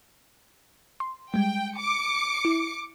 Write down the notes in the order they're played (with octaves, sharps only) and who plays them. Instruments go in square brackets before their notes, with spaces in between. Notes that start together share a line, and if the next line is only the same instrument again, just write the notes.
[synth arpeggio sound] C6
[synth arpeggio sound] G3 G#3 [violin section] G5
[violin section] D6 C#7
[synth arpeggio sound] E4